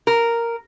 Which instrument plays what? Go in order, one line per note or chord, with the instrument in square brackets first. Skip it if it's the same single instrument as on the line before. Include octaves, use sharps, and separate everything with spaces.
[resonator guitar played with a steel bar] A#4